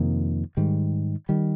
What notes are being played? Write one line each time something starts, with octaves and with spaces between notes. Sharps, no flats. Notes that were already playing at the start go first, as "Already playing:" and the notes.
Already playing: F2 C3 D#3 A#3
G#2 D#3 G3
D#3 G3